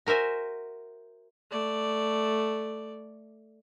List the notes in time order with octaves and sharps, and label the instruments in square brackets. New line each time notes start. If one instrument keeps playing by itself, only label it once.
[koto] F#4 A#4 C5 E5 G#5
[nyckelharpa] A3 D5